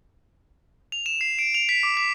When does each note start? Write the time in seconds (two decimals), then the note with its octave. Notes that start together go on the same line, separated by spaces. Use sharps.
0.92 F7
1.06 E7
1.21 C7
1.39 D7
1.55 F7
1.69 B6
1.83 D6
1.97 B6